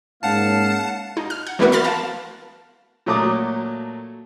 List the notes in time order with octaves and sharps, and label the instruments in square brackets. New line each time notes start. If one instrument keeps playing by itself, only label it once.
[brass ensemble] G#2 A#3 C#4 [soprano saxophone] F5 [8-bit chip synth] F#5 A5
[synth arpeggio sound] D#4
F6
F#5
E3 G3 A3 B3 F#4 A#4
B5 C6 F6 A6
A#4 F5 A5
[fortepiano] A#2 F#3 A3 A#3 D6 D#6